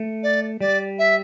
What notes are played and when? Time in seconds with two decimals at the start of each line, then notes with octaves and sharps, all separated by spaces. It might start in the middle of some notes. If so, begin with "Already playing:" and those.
Already playing: A3
0.23 D5
0.61 G3 D5
0.99 E5